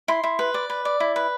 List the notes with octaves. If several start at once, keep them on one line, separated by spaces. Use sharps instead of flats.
E4 C6
E4
B4
D5
B4
D5
E4
B4